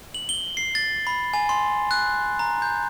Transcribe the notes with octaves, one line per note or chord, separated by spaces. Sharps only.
F#7
G7
C7
A6
B5
G#5
C6
F#6
A#5
G6